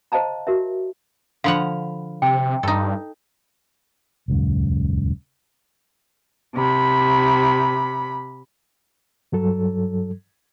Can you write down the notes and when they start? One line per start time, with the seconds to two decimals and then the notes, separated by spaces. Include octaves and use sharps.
0.12 C5 D#5 F5 A5 A#5
0.47 F#4 A#4 E5
1.44 D3 F3 F5 F#5 B5
2.22 C3 G5
2.63 G2 D#4 A4
4.28 D#1 C#2 F#2
6.55 C3 B5
9.32 G2 F#3 A4